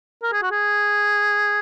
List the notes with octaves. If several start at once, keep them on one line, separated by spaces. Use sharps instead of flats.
A#4
G#4
F#4
G#4